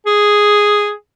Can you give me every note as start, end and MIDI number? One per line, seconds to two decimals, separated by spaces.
0.07 0.92 68